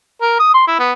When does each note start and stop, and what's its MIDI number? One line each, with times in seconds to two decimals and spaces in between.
0.22 0.35 70
0.39 0.52 87
0.54 0.65 84
0.67 0.78 64
0.79 0.92 59